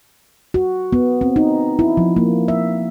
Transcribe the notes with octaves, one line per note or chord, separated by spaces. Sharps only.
F#4
B3
C4
D#4
E4
F3
A#3
E5